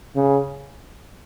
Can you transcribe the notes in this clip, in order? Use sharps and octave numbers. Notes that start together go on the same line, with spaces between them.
C#3